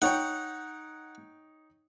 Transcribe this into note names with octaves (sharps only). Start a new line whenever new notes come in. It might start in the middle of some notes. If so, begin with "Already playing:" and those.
D#4 C#5 F#5 G5